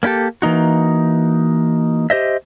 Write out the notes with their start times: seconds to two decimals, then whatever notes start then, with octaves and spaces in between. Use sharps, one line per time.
0.03 A#3 C#4 E4 G4 A4
0.42 E3 A#3 D#4 F#4
2.10 G4 C5 D#5 E5